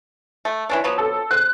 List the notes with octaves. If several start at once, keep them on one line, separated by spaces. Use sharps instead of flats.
A3
E3 C#4 D4
F3 F#3 B3
A4
C5 F#6